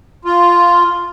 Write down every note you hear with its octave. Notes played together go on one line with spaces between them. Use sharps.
F4